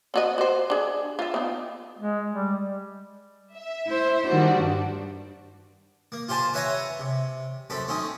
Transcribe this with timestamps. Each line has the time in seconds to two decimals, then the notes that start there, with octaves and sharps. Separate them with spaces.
0.14 C4 F#4 D#5
0.38 F#4 C5
0.70 D4 G#4
1.19 F4 E5
1.34 B3 D#4
1.99 G#3
2.33 G3
3.55 E5
3.87 E4 C5
4.27 D#3 G3 D4 F#4
4.58 G2
6.12 A#3
6.28 F4 G4 C5 G#5 A5
6.54 B4 C#5 E5 F#5 G#5 A#5
7.00 C3
7.70 F#2 C4 A4 B5
7.88 A3 C4 C#4 D#4